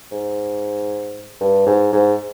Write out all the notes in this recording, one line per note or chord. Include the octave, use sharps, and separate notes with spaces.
G#2
G2
G#2
G#2